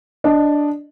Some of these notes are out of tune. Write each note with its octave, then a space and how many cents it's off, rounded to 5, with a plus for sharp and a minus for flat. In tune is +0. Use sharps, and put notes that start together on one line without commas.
D4 +0 D#5 -10